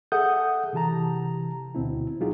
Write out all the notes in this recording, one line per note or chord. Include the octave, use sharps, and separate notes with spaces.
G#4 A4 E5 F#5 D#6 G6
C3 E3 G4 A5 A#5
D2 B2 C4 E4
F#3 D#4 F4 G4 G#4